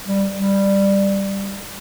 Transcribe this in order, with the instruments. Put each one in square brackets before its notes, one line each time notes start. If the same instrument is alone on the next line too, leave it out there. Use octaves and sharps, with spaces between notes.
[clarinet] G3
G3